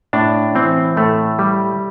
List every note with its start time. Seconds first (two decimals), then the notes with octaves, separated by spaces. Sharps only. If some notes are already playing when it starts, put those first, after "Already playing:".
0.13 A2 D4
0.55 E3 C4
0.97 A2 A3
1.39 G3